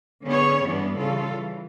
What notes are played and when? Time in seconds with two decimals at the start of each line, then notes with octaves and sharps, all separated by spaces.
0.25 D3 B3 C#4 G#4 C#5
0.67 G2 E3 B3 C#4 D4
0.97 C#3 E3 G3 F4 A4
1.33 E3